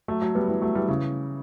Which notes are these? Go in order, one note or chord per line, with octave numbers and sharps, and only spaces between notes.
F#3 A3
F#3 A3
G3 B3
E3 G3
F#3 A3
E3 G3
C#3 E3